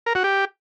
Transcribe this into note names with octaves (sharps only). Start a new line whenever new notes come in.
A#4
F#4
G4